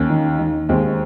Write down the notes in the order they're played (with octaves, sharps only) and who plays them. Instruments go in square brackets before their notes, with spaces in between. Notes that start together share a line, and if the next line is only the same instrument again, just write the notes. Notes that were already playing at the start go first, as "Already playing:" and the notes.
Already playing: [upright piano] D#2 A#3 C#4
D#3
D#3
D#2 G#3 C4